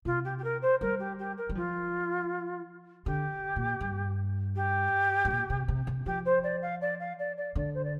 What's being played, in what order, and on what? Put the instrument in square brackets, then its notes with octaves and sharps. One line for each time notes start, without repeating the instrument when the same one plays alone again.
[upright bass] C3 [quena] F4
[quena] G4
G4
A#4
C5
[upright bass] G3 [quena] A#4
[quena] G4
G4
A#4
[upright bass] G3
[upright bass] F3 [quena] F4
[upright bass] D3 [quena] G4
[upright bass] A#2
G2
[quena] G4
[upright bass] G2
A#2
C3
C3
C3
[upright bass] F3 [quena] G4
[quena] C5
D5
F5
D5
F5
D5
D5
[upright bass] D3 [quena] D5
[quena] C5
D5